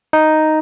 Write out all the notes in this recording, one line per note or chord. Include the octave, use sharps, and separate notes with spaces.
D#4